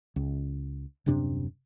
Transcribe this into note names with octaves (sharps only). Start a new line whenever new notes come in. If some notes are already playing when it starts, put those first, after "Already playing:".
C#2
D#1 F#2 C3 D4